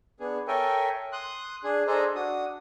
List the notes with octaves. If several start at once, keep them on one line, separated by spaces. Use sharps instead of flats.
B3 D4 G#4
A4 A#4 C#5 E5 G5 G#5
C6 D#6 F#6
D4 G#4
D4 G#4 A4 C5 D#5 A#5
D4 F#4 D#6